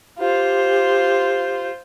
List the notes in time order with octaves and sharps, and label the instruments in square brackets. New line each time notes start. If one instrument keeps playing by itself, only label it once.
[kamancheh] F4 C5 [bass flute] G4